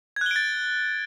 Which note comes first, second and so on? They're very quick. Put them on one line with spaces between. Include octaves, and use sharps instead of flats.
G#6 F#6 G7 D7 A6